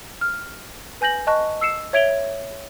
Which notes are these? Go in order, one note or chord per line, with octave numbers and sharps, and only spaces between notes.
F6
B4 G#5 G6 A#6 F#7
D#5 A5 C#6 F#6
E6 C7 C#7 E7
C#5 E5 G#6 D7 F7 G7